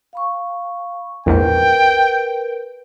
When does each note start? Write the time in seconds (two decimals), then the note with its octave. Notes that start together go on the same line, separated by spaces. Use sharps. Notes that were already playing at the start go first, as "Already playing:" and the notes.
0.13 F5 B5 C#6
1.26 A#1 E2 G#2 A#4 B4 G5